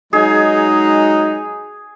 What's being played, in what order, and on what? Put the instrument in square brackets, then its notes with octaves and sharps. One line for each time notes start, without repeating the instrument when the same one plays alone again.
[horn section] F#3 G#3 D#4 [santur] G#4 G#5